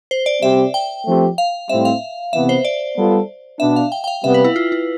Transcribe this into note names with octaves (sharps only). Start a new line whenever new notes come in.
C5
D5
C3 G3 C4 G4 E5
G5
F3 A3 C4 G4
F5
A2 G3 C4 E5
F5
C3 E3 B3 E5
C5
D5
G3 B3 F4 A4
B2 B3 D4 E5
F5
G5
G5
F5
C3 G3 B3 E5
B4
E4
F4
E4